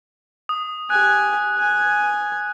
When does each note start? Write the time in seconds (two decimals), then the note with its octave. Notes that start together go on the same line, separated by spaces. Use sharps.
0.49 D#6
0.90 G4 G#5 F#6
1.58 G#5